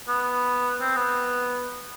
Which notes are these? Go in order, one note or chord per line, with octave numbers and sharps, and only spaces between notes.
B3
C4
B3